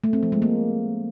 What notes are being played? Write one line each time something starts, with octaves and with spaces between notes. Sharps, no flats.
A3
C4
F3
G#3
A#3